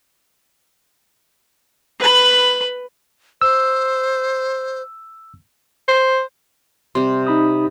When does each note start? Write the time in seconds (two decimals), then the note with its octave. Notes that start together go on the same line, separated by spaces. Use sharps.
2.00 B4 B5
3.42 C5 E6
5.88 C5
6.95 C3 G3 C6
7.27 D#4 B5 D#6